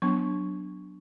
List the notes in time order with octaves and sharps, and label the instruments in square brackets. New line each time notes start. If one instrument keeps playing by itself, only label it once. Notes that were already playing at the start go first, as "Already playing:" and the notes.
[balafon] F#3 B3 D4 C#6